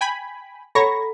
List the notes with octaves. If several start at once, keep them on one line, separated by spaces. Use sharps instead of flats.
G5 G#5 B5
A4 C#5 F#5 A#5 B5 C#6 A#6